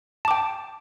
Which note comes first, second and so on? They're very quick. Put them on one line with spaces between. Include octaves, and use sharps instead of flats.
A5 D6 G5